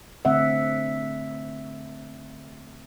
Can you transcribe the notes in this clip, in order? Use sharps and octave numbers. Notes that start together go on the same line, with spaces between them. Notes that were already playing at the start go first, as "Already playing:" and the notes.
D3 A3 C4 E5 F#5